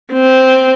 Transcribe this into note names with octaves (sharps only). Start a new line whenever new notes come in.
C4